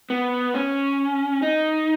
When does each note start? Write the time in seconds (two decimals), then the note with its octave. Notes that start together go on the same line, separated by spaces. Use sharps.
0.10 B3
0.54 C#4
1.42 D#4